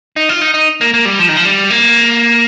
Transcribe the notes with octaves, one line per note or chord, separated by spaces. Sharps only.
D#4
F4
D#4
D#4
A#3
A#3
G3
F3
D#3
F3
G3
A#3